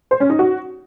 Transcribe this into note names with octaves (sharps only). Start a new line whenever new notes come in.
C5
C#4
D#4
F#4